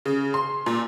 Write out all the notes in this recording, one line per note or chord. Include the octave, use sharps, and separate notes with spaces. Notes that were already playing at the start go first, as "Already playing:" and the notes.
C#3
C6
A#2